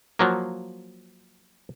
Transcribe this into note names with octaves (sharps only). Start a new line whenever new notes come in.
F3 F#3 A#3